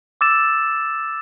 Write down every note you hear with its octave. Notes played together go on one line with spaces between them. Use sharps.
D6 E6 A6 E7